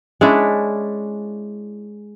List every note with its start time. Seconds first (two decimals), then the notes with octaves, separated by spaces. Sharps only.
0.21 G#3 C#4 D4 E4